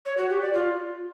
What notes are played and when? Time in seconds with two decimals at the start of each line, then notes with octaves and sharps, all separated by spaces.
0.06 C#5
0.18 F#4
0.29 G4
0.41 D5
0.53 F4